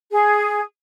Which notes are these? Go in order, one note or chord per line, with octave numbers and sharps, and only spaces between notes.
G#4